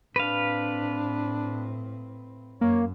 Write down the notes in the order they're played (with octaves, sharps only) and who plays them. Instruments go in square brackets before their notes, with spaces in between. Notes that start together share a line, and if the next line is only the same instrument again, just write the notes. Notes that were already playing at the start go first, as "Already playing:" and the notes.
[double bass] A2 C4 [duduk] D4 [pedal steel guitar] B4 F5
[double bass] F#2 [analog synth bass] A#3 [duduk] C#5